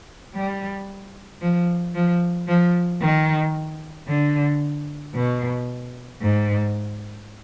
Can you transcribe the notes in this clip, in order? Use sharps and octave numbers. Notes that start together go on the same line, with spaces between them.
G3
F3
F3
F3
D#3
D3
B2
G#2